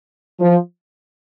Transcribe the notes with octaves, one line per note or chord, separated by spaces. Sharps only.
F3